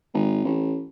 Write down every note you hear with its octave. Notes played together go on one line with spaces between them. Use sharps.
G#1
A1